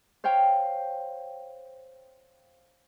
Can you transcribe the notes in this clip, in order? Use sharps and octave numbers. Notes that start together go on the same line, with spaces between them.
C5 C#5 F5 G5